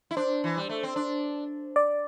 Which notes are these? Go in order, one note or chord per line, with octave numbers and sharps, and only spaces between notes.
E4
D4 C5
E3
G3
A3
C4
D4
D5